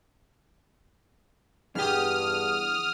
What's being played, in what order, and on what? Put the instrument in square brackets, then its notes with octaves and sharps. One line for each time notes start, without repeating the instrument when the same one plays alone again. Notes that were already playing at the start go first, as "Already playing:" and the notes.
[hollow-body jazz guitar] E2 G4 [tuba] G2 [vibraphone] G#4 F#5 [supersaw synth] D#6 F6